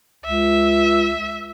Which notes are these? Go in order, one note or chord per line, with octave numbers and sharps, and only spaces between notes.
C#2 E5